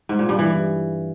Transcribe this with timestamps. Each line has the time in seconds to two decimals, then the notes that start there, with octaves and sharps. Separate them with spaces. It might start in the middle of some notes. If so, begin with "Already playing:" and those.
0.09 G#2
0.19 A#2
0.29 G2
0.39 E3